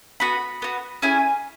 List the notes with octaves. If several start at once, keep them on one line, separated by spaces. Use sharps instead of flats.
B3 F#4 B5
B3 F#4
C#4 E4 G#4 G#5